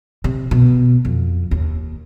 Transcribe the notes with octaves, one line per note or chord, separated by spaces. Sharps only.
C3
B2
F2
D#2